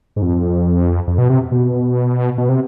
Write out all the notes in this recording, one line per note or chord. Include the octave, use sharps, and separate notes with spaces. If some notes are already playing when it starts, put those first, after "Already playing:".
G#2
F2
F2
B2
C3
B2
B2
C3